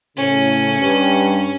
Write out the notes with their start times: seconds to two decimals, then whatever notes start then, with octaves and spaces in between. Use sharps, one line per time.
0.17 A2 C#3 C#4
0.80 G2